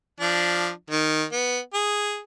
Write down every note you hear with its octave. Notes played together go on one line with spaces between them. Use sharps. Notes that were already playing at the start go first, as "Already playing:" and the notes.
F3 D4
D#3
B3
G#4